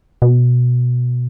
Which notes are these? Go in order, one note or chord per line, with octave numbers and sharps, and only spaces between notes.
B2